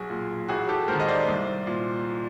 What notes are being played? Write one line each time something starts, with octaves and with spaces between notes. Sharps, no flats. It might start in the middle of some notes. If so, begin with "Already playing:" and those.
Already playing: B1 F#4 G#4
A#2
A1 F#4 G#4
G4 A4
G#2 D#3 A#4 C5
D#5
C5 D5
C2
A#2